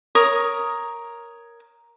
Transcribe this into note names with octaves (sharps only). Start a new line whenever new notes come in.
A#4 C#5 D#6